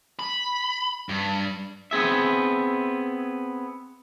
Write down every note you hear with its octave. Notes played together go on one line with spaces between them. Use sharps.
B5
G2
B3 C4 G#4 E5